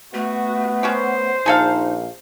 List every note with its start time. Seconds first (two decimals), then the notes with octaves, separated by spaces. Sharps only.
0.14 A3 B3 F#4
0.83 C#4 F#4 G4 C5
1.46 A#1 D#4 G#4 A4 F5